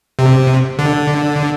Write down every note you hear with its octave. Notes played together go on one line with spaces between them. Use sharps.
C3
D3